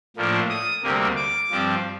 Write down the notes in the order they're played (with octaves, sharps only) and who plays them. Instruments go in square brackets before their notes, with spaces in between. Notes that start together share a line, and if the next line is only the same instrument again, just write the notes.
[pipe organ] A2 F3 A#3 D4
D#6
D2 C3 G3 A#3
D6
G2 F3 C4